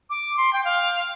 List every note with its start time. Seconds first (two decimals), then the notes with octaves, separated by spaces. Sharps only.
0.10 D6
0.37 C6
0.53 G5
0.65 F5